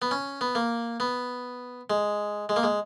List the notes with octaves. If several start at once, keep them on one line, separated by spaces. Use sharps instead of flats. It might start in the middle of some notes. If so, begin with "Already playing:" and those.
B3
C#4
B3
A#3
B3
G#3
G#3
A#3
G#3